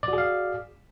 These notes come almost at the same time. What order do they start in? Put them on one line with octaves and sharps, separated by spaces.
D5 F#4 G#4 F5